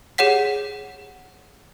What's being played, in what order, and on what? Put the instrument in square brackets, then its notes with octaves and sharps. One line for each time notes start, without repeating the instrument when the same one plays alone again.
[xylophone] G4 G#4 C#5 F#5 B6